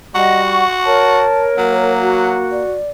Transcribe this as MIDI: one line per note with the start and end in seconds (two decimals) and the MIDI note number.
0.15 0.64 55
0.15 1.24 66
0.15 0.42 75
0.15 0.64 78
0.46 0.78 85
0.86 1.90 70
0.86 1.93 73
0.86 1.46 81
1.58 2.39 54
1.58 2.63 58
2.01 2.74 66
2.51 2.90 74